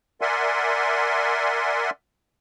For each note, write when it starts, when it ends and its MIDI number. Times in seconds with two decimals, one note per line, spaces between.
0.21 1.90 70
0.21 1.90 74
0.21 1.90 76
0.21 1.90 78
0.21 1.90 80
0.21 1.90 84